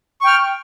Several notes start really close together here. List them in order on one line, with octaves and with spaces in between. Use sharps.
C#6 G5 F6